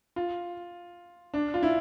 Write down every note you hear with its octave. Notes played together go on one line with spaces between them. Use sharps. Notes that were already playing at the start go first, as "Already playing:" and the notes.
F4
D4
F4
E4